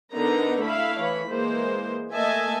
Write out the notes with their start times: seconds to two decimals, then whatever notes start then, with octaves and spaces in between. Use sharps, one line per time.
0.13 D3 B3 D#4 A#4 B4 A#5
0.62 A3 E4 E5 F5 B5
0.99 E3 C#5 B5
1.29 E3 G#3 A#3 C5
2.11 A3 A#3 D#5 E5 G#5 A5